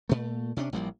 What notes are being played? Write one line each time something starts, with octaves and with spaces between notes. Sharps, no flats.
A#2 A3
C3 C#4 D4
A1 F3 G3 A#3